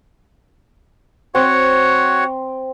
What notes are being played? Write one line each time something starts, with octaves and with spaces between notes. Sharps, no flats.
C4 F#4 C#5 F#5